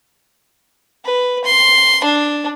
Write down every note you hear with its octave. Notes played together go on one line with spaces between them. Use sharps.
B4
C6
D4